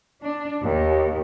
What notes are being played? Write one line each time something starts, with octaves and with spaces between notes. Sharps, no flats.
D4
D#2